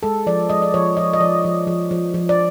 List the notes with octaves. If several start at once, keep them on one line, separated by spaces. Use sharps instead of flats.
G#3 A4
F3 D5
G#3 D#5
D5
F3 C#5
F3 D#5
D#5
F3 D5
F3
F3
F3
F3
D5